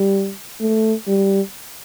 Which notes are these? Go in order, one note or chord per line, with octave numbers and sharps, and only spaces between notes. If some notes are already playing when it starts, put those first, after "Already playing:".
Already playing: G3
A3
G3